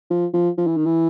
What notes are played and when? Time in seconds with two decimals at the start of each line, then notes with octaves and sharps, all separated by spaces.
0.10 F3
0.33 F3
0.58 F3
0.67 E3
0.77 D#3
0.86 E3